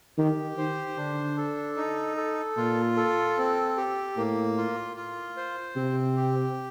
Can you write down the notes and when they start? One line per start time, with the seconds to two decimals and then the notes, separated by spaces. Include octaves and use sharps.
0.18 D#3 G4
0.57 D#3 C5
0.97 D3 D4
1.37 A4
1.77 D#4
2.17 A4
2.57 A#2 F4
2.96 A4
3.37 C4
3.77 G4
4.17 A2 A#3
4.57 F4
4.97 F4
5.37 C5
5.76 C3 C4
6.16 G4